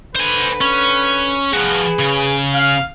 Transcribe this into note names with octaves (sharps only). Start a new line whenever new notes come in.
D3 B4 C5 G#5
C#4
F3 F#4 G#4 B4
C#3
F5